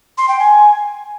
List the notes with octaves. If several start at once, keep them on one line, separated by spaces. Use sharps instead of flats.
C6
G5
G#5